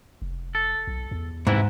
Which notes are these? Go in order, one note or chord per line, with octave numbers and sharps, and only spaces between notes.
F1
A4
B1
E2
G#2 C3 E3 E4